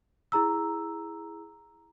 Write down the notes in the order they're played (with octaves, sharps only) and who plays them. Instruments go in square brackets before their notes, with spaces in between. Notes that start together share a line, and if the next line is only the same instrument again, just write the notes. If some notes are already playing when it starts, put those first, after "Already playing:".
[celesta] E4 G#4 A#5 E6